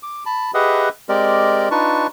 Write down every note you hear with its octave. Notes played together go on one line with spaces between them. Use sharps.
D6
A5 B5
G4 G#4 B4 D#5 E5 F#5
G#3 C4 G4 A#4 D5 D#5
D4 D#4 F4 B4 A5 C#6